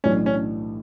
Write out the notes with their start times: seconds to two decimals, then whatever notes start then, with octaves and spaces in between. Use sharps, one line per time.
0.04 B1 A2 E3 A3 C#4 D4
0.26 C#4